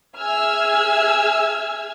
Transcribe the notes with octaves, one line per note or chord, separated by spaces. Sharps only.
G#4 E5 G#5 E6 F6 G#6